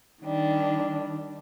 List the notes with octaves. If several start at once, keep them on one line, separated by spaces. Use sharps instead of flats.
D#3 G3 D4